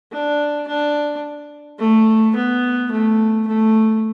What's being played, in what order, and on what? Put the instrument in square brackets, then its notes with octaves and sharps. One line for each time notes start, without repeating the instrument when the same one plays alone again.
[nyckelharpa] D4
D4
A3
B3
A3
A3